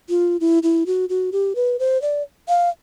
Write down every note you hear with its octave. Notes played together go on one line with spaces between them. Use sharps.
F4
E4
E4
F#4
F#4
G4
B4
C5
D5
F5